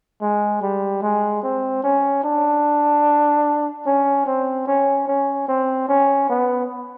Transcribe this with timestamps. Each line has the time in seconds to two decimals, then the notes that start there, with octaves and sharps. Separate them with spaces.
0.22 G#3
0.62 G3
1.03 G#3
1.43 C4
1.84 C#4
2.24 D4
3.87 C#4
4.27 C4
4.67 C#4
5.08 C#4
5.48 C4
5.89 C#4
6.30 B3